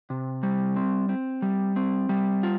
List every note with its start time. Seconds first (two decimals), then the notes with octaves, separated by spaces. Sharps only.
0.10 C3
0.43 G3
0.76 C4
1.09 C4
1.42 G3
1.76 C4
2.09 G3
2.43 F4